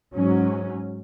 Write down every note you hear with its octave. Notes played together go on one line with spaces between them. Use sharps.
G#2 F#3 C#4